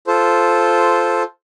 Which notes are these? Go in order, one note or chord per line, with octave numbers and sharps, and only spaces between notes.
F4 A4 C5